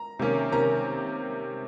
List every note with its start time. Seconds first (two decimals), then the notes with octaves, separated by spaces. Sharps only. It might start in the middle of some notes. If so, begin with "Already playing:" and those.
Already playing: A#5
0.19 C3 D#3 A#3 C#4
0.52 C3 D#3 A#3 C#4 A#5